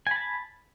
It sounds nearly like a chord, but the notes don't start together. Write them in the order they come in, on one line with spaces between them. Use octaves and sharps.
G#5 B5 A5